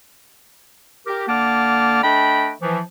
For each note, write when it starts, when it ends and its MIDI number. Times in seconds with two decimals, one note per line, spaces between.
1.06 1.24 67
1.06 1.24 70
1.28 2.01 50
1.28 2.01 58
1.28 2.01 78
1.28 2.01 81
1.28 2.01 86
1.28 2.01 89
2.04 2.51 57
2.04 2.51 62
2.04 2.51 75
2.04 2.51 79
2.04 2.51 83
2.62 2.80 52
2.62 2.80 53